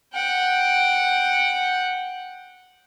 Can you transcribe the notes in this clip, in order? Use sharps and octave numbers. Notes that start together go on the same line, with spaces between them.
F#5 G5